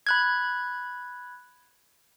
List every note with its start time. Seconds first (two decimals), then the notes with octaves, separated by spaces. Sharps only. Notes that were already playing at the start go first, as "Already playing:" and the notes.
0.07 B5 F#6 G#6